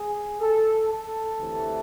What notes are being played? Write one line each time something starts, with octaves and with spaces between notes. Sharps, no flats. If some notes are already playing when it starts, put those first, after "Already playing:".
Already playing: G#4
A4
A4
D2 C3 E3 A3